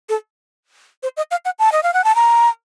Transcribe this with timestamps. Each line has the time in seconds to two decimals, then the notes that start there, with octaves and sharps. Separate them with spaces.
0.09 A4
1.03 C5
1.17 D#5
1.31 F5
1.45 F#5
1.59 A5
1.72 D#5
1.83 F5
1.94 F#5
2.04 A5
2.15 A#5